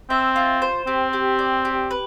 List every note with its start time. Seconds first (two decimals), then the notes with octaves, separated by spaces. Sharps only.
0.10 C4 E5
0.36 F4
0.62 C5
0.87 C4 G4
1.13 G4
1.39 D5
1.65 G4
1.91 B4